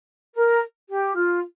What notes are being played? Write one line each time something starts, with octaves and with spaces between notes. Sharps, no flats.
A#4
G4
F4